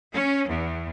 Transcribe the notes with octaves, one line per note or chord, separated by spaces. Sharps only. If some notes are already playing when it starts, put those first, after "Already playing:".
C#4
E2